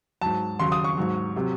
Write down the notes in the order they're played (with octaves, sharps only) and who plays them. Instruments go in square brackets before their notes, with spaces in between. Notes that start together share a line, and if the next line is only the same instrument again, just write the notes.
[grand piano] G#2 F#3 A5
D#2 C#3 F#3 C6
D#6
C#6
G#2 F#3
C3 F#3